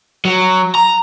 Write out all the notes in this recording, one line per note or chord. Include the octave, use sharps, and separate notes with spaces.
F#3
A#5